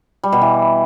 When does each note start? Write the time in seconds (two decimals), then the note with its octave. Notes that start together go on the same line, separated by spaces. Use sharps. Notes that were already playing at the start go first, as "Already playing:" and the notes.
0.23 G3
0.32 B2
0.41 E3